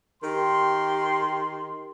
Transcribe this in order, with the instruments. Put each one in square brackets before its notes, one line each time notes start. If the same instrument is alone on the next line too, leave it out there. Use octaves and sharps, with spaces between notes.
[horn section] D#3 G4 C6